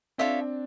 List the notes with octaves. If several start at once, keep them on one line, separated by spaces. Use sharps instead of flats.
C4 D4 F4 A4 C#5 E5